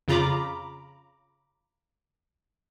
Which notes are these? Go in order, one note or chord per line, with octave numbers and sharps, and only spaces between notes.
F2 C#3 F4 A#5 B5 D6